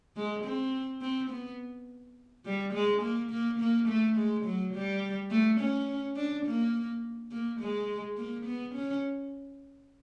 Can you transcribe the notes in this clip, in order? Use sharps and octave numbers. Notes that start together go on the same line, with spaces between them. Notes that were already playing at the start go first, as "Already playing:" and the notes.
G#3
C4
C4
B3
G3
G#3
A#3
A#3
A#3
A3
G#3
F#3
G3
A3
C#4
D4
A#3
A#3
G#3
A#3
B3
C#4